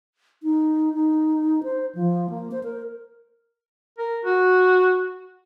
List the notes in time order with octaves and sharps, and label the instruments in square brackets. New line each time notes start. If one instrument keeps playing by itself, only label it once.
[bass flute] D#4
D#4
C5
F3
A#3
C5
A#4
[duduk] A#4
F#4